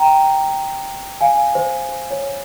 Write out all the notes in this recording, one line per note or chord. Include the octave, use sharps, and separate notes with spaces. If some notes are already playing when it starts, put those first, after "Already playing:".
Already playing: G5 A#5
F5 G#5
C5
C5
C#5